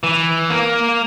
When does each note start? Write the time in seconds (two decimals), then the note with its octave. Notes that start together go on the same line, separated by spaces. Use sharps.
0.04 E3
0.50 A#3